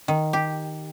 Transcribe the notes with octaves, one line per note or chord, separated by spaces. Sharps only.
D#3
G4